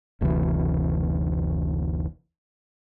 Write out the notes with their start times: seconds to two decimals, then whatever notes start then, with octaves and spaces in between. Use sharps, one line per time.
0.21 F#1 D2 C3 E3